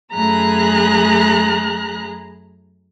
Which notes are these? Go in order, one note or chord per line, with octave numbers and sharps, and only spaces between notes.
F#2 A3 G#4 A#5 B5 F#6